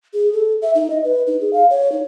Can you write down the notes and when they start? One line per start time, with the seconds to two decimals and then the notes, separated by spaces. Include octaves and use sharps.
0.14 G#4
0.33 A4
0.62 E5
0.75 D#4
0.90 D#5
1.04 B4
1.27 D#4
1.41 G#4
1.53 F5
1.70 C#5
1.92 D#4